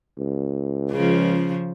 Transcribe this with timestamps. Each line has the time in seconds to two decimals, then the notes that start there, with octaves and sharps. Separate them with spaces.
0.18 C#2
0.91 C#3 F3